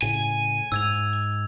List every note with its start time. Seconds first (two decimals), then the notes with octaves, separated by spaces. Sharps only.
0.02 A2 C#3 G#5
0.72 G#2 E6 G#6 F7